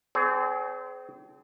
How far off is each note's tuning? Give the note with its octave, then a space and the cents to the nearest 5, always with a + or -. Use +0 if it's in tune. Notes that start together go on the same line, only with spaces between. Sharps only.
C4 -30 G#4 +25 C#5 +45